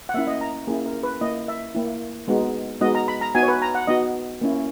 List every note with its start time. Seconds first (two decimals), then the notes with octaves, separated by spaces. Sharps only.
0.09 F#5
0.14 A#3 C#4 E4 E5
0.27 D#5
0.41 A#5
0.67 A#3 C#4 E4 G#4
0.86 A#4
1.03 B4
1.21 A#3 E4 D#5
1.48 E5
1.75 A#3 E4
2.28 G#3 B3 D#4 F#4
2.81 G#3 B3 D#4 F#4 D#5
2.95 A#5
3.08 B5
3.21 A#5
3.35 B3 D#4 F#4 G#5
3.43 C#5
3.48 B4
3.62 A#5
3.75 F#5
3.87 B3 D#4 F#4 D#5
4.41 A#3 C#4 E4